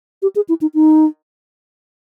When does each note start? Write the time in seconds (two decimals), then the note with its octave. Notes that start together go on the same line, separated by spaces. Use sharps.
0.22 G4
0.36 G#4
0.49 E4
0.61 D#4
0.74 D#4